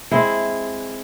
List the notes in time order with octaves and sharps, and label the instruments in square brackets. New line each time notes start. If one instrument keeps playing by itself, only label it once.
[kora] G#3 C4 E4